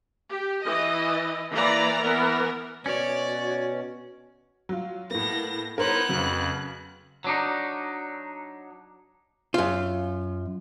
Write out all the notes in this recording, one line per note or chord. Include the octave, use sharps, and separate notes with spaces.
G4
E3 D#5
E3 A#3 D5 A#5
E3 B3 A#4
B2 C#4 F#4 C#5 D5
F#3 F4
A2 A#3 B3 A#6
B3 D#4 E4 A#4 C5 C#5 F#6
F2 C#3 F#3
F#3 D4 D#4
F#2 F4